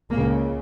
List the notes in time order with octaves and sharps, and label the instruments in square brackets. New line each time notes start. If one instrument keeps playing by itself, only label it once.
[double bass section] C#2 A#2 C#3 A#3